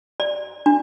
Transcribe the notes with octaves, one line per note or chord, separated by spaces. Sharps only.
D5
D4